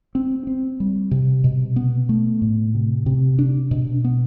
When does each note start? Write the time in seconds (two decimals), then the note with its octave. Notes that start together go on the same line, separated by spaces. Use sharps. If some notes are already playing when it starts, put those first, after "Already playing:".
0.15 C4
0.47 C4
0.80 G3
1.11 C3
1.44 B2
1.76 B3
2.09 A3
2.42 A2
2.75 C3
3.06 C3
3.39 D4
3.71 B2
4.04 B3